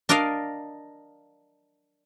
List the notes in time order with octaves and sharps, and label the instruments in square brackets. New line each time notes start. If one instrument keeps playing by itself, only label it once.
[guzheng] D4 A#4 D5 D#5 F5